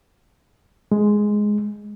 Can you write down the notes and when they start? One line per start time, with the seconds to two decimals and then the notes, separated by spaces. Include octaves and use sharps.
0.92 G#3